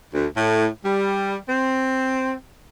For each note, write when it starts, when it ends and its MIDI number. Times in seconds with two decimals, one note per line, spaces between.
0.14 0.28 38
0.36 0.67 45
0.85 1.36 55
1.49 2.34 60